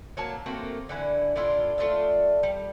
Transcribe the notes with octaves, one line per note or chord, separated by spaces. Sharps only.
F#3 A#3 A5
A3 A#3 C4 F#4
D3 E3 E4
A2 D4 E4 F4
A3 F4 D5 E5
G3